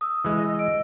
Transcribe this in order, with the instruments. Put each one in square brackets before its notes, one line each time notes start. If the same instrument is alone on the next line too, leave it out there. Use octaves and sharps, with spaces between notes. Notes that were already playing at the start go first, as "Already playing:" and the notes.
[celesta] D#6 E6
[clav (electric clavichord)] E3 G#3
[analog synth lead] D#5
[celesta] E6 D7